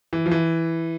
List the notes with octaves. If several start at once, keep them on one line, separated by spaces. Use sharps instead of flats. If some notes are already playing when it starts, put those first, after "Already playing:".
E3
F3
E3